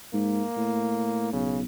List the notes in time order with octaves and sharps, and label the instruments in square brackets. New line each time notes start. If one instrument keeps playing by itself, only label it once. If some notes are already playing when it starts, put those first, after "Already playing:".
[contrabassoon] G#2 [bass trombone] A#3
[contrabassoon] A2
[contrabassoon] B1 [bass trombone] C#3